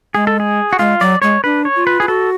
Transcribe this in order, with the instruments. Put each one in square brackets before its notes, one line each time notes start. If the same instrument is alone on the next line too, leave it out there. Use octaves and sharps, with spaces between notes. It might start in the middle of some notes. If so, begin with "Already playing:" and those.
[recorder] G#3 [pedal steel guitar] G#4
[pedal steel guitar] A4
G#4
F#4
[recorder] G#3 [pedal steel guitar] F4
[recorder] F#3 [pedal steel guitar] D5
[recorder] G#3 [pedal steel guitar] C#5
[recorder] D4 [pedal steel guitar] B4
[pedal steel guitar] C#5
[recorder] F4
[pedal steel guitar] B4
[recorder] F4 [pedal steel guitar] G#4
[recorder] F#4 [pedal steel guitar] A4